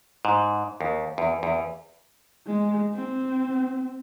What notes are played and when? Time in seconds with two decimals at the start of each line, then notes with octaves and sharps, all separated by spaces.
0.25 G#2
0.81 D#2
1.18 E2
1.43 E2
2.47 G#3
2.95 C4